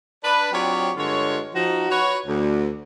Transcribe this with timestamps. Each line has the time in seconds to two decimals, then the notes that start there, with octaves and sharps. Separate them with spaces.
0.24 D4 B4
0.53 F#3 C4 D4 F4 G4 C#5
0.97 G2 D3 G#3 F4 C#5
1.55 F3 D#4 F#4
1.90 F#4 B4 C#5
2.27 D2